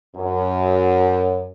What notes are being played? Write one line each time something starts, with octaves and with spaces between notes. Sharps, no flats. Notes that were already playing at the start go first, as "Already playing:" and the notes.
F#2